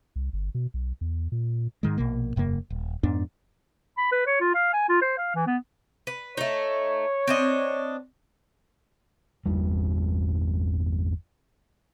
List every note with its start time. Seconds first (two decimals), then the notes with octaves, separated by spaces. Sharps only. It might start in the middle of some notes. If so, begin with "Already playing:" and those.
0.16 C2
0.33 G1
0.55 B2
0.74 B1
1.01 E2
1.32 A#2
1.83 G#2 D#3 G#3
1.98 A#1 B2 A#3
2.36 E1 F#2 C#3 A#3
2.70 D#1
3.03 F2 G#2 B3 D4
3.98 B5
4.12 B4
4.27 C#5
4.40 F4
4.55 F5
4.73 G#5
4.89 F4
5.02 C5
5.18 F5
5.35 E3
5.47 B3
6.07 B4
6.37 A3 D#4 C#5
7.28 C4 D4 D#5
9.46 G1 E2 G3